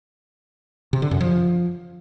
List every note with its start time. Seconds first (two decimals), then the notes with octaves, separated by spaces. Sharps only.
0.93 C3
1.02 D3
1.11 F#2
1.20 F3